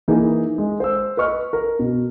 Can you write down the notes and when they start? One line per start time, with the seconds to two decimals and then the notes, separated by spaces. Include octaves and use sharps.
0.08 E3 A#3 D#4 G#4
0.58 G#3
0.80 C5 E6
1.17 B4 D#5 C#6 F6
1.53 A#4
1.79 B2